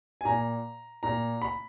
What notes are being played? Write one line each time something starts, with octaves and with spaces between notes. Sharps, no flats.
G#5
A#2 A#5
A#2 A#5
B5